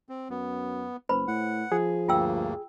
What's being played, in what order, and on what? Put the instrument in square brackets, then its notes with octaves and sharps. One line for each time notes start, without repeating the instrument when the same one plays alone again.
[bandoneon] C4
[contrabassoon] F#2 [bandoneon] B3
[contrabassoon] F#1 [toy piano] B4 C5 B5
[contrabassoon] A2 [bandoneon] F#5
[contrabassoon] F3 [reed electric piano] G#4
[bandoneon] D2 G2 A#3 [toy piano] F4 G5 E6